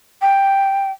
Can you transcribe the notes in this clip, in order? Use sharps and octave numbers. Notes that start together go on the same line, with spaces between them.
G5